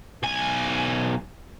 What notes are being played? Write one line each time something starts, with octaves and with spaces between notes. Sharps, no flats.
B1 G#5